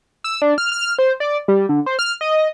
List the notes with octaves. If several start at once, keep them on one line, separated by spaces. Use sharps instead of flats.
E6
D4
F6
F6
C5
D5
G3
D3
C5
F6
D#5